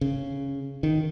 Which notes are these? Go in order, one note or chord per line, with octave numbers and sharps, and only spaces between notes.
C#3
D#3